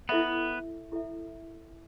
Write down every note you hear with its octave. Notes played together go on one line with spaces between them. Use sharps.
B3 E4 A4 E5
E4 A4 E5